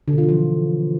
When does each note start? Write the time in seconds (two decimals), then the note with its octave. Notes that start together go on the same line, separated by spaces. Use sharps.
0.08 D3
0.13 B2
0.18 F4
0.23 E3
0.29 F3